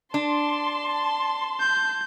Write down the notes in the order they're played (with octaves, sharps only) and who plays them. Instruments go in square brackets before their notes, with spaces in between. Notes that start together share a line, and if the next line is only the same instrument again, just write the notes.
[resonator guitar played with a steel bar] D4 [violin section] A5 C6
[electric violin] G6